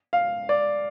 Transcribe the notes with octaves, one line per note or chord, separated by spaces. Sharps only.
F5
D5